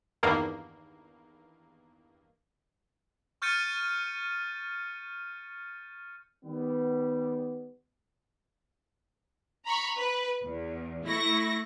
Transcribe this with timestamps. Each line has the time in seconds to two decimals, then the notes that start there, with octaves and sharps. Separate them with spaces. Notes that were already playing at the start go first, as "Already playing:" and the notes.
0.23 E2 G2 D#3 A#3
3.42 C#6 F6 G6 A6 C#7 D#7
6.45 D#3 G3 B3
9.65 A#5 B5 C#6
9.97 B4
10.43 E2
11.04 A3 E4 C#6 A#6